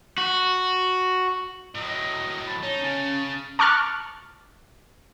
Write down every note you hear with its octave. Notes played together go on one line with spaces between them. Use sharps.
F#4
A2 F#3 D#5
A5 B5
C#4 D#4
C#3 A5
A5 C#6 D6 F6 F#6 A6